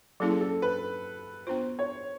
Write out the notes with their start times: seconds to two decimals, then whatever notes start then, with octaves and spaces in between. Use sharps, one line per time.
0.20 F#3 A#3 C#4 E4 G#4 A4
0.41 A4
0.62 B4
1.47 B3 D4 F4 C5
1.79 C#5